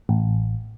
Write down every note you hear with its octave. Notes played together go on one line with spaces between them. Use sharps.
A1